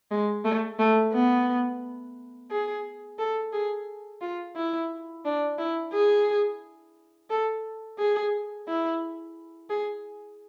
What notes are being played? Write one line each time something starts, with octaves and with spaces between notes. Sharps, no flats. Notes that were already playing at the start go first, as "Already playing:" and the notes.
G#3
A3
A3
B3
G#4
A4
G#4
F4
E4
D4
E4
G#4
A4
G#4
E4
G#4